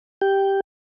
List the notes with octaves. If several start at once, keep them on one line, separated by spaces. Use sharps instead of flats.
G4 G5